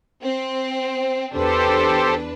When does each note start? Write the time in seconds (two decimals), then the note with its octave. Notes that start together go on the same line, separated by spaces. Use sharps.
0.23 C4
1.34 E2 D4 G4 A4 B4 C5